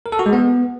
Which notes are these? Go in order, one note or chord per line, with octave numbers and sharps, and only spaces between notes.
A#4
A4
F#4
G#3
B3